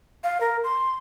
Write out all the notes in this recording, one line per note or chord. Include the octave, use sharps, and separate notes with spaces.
F5
A#4
C6